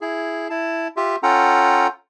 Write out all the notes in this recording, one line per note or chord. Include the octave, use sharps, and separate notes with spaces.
E4 G#4
E4 A5
F4 G4 E5
C#4 F4 A4 F#5 G5 A#5